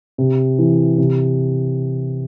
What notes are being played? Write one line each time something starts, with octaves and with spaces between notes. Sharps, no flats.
C3
E3
C3